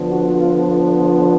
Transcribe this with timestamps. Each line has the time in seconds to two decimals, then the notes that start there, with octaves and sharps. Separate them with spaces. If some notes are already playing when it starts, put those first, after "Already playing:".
Already playing: D3 F3 B3
0.09 F#4
0.39 F4